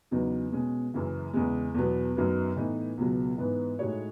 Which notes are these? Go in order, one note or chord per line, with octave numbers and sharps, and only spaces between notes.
E2 C#3 F#3 B3 D#4
B2 G#3 C#4
F#1 F#2 C#3 E3
E2 C#3 G#3
E2 B2 F#3 B3
F#2 D#3 F#3 B3
A2 E3 B3 D#4
C#2 B2 F#3
G#2 E3 B3
A2 G#3 D#4 F#4 C#5